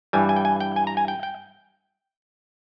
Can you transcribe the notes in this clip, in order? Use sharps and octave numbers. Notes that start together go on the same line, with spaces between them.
G2 E3 G3 G#5
G#5
G5
G#5
G5
G#5
A#5
G#5
G5
G5